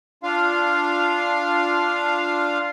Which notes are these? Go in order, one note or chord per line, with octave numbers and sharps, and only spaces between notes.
D4 F4 F5